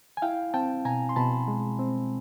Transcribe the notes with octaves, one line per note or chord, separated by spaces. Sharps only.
G#5
E4 F5 G5
C4 G5 A5
B2 G#5 A#5
C6
B2 A5 B5
G#3
C4